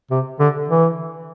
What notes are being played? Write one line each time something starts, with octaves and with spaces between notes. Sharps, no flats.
C3
D3
E3